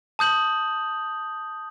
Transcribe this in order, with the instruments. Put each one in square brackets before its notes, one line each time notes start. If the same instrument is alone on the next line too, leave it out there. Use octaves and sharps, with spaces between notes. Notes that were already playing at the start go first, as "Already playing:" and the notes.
[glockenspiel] A5 D#6 G6 F#7